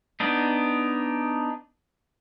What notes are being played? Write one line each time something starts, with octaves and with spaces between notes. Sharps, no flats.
B3 D4 D#4